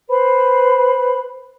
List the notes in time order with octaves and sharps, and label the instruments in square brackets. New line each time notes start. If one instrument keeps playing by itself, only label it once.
[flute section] B4 C5 B5